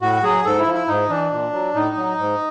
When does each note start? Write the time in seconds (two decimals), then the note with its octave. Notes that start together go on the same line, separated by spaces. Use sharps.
0.01 A2 F#4
0.23 F#3 G#4
0.45 G#2 A4
0.59 E4
0.66 F3
0.74 E4
0.88 G#2 D#4
1.10 E3 D4
1.31 A#2
1.52 F#3
1.74 A2 D#4
1.96 F#3
2.18 G#2